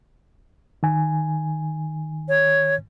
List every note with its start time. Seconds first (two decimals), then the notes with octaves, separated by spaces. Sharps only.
0.83 D#3 G#5
2.28 C#5